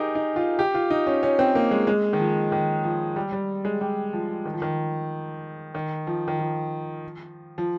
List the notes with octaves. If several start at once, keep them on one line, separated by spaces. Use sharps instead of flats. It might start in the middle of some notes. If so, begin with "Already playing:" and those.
Already playing: D#4 G4 G#4 A#4
D#4
F4
G4
F4
D#4
C#4
C#4
C4
A#3
G#3
G#3
D#3
F3
D#3
F3
G3
G3
G#3
G3
F3
D#3
F3
D#3
D#3
F3
D#3
F3
F3